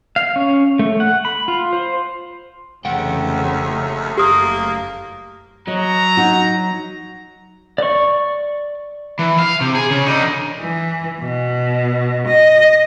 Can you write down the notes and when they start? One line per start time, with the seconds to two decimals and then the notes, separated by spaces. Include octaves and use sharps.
0.16 F5
0.36 C#4
0.79 A3
1.00 F#5
1.25 B5
1.48 F4
1.73 C5
2.85 F1 D#2 C#3 E3 A3 F#5 G5
4.17 F#1 A#3 G4 D#6
5.68 F#3 D#5 A#5
6.17 D#4 F#4
7.78 D5 C#6
9.19 E3
9.39 F5
9.61 C3
9.75 G#4
9.91 C#3
10.06 D3 D#4
10.60 E3
11.21 B2
12.27 D#5